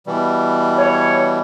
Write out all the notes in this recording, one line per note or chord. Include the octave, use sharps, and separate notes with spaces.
B2 E3 G3
C#5